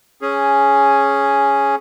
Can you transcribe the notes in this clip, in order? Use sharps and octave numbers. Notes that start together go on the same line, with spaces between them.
C#4 G#4